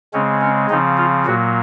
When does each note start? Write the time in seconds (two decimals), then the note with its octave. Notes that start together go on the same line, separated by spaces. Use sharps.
0.13 C#3 G#3 C4 C#4
0.41 C#4
0.69 C#3 F3 C4 D#4
0.98 F4
1.26 A#2 F#3 A#3 F#4